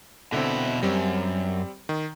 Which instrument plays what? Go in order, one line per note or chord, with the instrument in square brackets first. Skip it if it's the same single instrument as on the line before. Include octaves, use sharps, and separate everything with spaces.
[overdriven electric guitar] B2 E4 [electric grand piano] D3 C4
[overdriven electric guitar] F#2 [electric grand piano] G3 C4
[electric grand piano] D#3